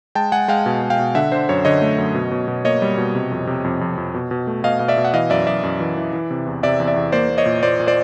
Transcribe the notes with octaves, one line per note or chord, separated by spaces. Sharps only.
G#3 G5 A5
G#3 F#5 G#5
G#3 F5 G5
B2
G#3
F5 G5
B2
D3 E5 F#5
D3 C5
F#2 C#5
D3 C#5 D#5
A3
F#2
B2
B2
B2
A#3 C#5 D#5
G3
B2
C3
F2
C3
F2
F2
F2
B2
B2
A3
B2 D#5 F5
B2 F5
D5 E5
B2
F#5
E3 D#5 F5
F#2 D5 E5
F#2 D5 E5
F#2
E3
E3
E3
C3
E2
C3 D5 E5
E2
D5 E5
E2
A#3 C5 D5
A#3
C#5 D#5
A#2
A#2 C5 D5
A#2
C5 D5